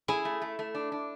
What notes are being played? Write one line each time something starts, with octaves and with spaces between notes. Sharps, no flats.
E4 G#4
A3
A3
A3
D4
D4